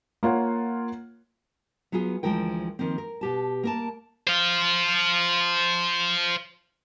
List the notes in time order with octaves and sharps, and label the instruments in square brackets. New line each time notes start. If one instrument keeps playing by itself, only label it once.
[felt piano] A#3 F4 C#5 F#5
[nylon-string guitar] F#3 B3 F4 G#4
D2 E3 F3 G#3 A#4 G5
D#3 F3 A#3 C4
A#4
B2 G4 A5
A#3 A#4 A5
[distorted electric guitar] C5 F5